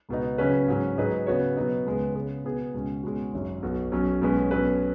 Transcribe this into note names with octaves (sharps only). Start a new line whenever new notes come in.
C#2 B2 B3 D#4
C#3 F#3 C#4 B4
G#2 F#3 C#4
G#2 F#3 D#4 G#4 B4
C#3 B3 F#4 C#5
B2 F#3 B3 D#4
C#2 C#3 G#3 B3
C#3 B3 G#4
B2 B3 G#4
C#2 B2 G#3 C#4
B2 G#3 C#4 F#4
G#1 F#2 F#3
B1 B2 B3 F#4
B1 B2 F#3 C#4
B1 B2 G#3 C#4 B4
B1 B2 F#3 C#4 B4